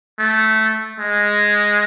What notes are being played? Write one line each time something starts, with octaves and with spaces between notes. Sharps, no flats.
A3
G#3